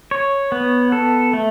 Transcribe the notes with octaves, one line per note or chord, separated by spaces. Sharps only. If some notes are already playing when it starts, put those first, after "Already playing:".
C#5
B3
A4
A3